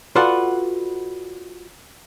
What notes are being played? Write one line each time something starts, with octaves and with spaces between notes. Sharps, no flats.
F4 F#4 A4 B4 D5 F#5